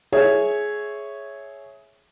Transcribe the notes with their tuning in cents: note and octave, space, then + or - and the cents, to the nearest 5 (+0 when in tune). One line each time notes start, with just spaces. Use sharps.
G#4 +15 C#5 +0 E5 +0